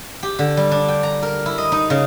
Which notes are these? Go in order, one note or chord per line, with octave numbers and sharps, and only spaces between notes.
G4
D3
G3
D4
G5
A#5
A#4
E4
D#5
D#4
C#3